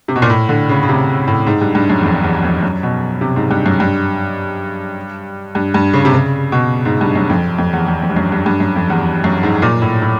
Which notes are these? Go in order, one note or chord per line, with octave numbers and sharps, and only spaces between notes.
C3
B2
A#2
A2
D3
C#3
C#3
C3
A2
G#2
G2
G2
F#2
E2
F2
E2
F2
F#2
B2
C3
G#2
G2
F#2
G2
G2
G2
C#3
C3
C#3
B2
G#2
G2
F#2
F2
F2
E2
E2
F2
G2
F#2
G2
G2
F#2
F2
E2
F#2
G#2
A#2
A2
A2